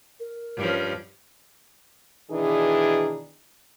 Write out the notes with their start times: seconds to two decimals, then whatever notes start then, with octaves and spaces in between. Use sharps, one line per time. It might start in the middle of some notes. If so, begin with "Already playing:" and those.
0.20 A#4
0.56 G2 F3 C#4
2.31 B2 D#3 E3 D4 G#4